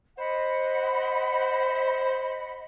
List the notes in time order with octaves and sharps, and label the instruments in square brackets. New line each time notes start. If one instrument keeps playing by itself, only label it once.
[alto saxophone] C5 [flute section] D#5 F#5 B5